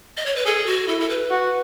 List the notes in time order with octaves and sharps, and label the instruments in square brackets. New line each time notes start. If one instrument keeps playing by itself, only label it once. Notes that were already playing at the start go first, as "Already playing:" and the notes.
[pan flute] D#5
C#5
B4
[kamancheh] G#4 [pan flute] A4
[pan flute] F#4
[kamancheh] E4 [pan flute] A4
[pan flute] A4
B4
[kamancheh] F#4